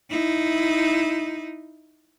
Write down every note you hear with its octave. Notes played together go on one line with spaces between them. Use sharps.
D#4 E4